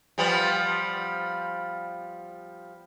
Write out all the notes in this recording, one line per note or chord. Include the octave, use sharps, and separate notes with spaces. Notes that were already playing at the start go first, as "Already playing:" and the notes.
F3 G3 B3